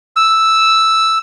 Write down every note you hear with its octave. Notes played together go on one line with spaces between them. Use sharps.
E6